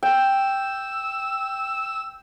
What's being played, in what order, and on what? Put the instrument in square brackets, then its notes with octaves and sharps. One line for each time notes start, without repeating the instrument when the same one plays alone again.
[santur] G5 [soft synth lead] E6